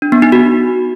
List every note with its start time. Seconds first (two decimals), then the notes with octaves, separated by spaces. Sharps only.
0.02 D4
0.12 B3
0.22 D#4
0.32 F#4